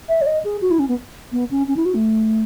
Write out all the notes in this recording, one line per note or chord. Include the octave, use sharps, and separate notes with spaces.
E5
C#5
D#5
G#4
F#4
E4
C#4
B3
B3
C#4
C#4
E4
F#4
A3